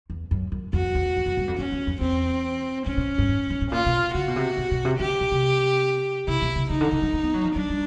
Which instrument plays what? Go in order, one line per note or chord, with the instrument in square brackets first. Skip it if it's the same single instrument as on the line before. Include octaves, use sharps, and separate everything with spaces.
[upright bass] E2
F#2
F#2
[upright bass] F2 [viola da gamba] F#4
[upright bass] E2
F2
F#2
G2
F2
[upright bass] F2 [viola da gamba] C#4
[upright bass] E2
F2
[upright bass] E2 [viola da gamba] C4
[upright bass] A2 [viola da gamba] C#4
[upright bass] A#2
G2
G#2
G#2
A2
[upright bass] A#2 [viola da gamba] F4
[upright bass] B2
[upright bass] C#3 [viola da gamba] F#4
[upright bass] B2
C3
B2
B2
C3
[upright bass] D3 [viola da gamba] G4
[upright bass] B2
C3
[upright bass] C3 [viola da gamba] E4
[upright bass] B2
C3
[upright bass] C#3 [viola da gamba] D#4
[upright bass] D3
D#3
G#3
A#3
B3
F#3
F3
[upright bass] F#3 [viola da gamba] D4
[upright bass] G3